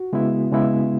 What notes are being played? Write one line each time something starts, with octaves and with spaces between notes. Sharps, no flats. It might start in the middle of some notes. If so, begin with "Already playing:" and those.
Already playing: F#4
C#3 G#3 B3 E4
C#3 G#3 B3 E4